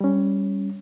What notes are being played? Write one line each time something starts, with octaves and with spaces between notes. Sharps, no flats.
G3 C#4